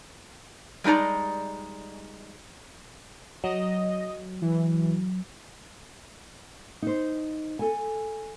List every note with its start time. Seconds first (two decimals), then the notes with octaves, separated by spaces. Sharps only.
0.84 G3 G#3 D#4 D5 A#5
3.44 F#3 D#5
4.42 E3
6.82 D#4 C5
7.59 A4 G#5